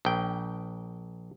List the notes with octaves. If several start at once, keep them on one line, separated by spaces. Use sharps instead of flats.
A#1 G5